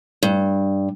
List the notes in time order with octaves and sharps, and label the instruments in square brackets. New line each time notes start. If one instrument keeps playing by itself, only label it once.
[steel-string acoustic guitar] G2